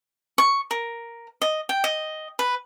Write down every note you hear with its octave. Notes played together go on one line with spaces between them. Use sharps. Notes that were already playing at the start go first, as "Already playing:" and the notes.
C#6
A#4
D#5
G5
D#5
B4